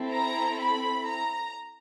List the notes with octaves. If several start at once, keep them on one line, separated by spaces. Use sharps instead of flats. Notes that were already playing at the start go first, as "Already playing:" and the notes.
Already playing: C4 E4 A4
A#5
B5
A#5